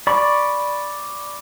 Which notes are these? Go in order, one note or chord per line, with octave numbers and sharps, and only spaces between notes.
D5 B5 C#6